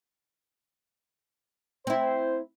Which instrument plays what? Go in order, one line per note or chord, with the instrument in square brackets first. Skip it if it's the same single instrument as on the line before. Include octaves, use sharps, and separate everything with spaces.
[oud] C4 E4 [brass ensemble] C5